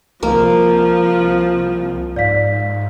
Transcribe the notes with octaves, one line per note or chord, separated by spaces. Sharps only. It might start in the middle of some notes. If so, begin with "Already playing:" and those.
C2 F3 A#3
G#2 D5 F5 B6